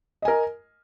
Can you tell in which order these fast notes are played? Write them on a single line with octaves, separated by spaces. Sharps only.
D#5 G#5 A#4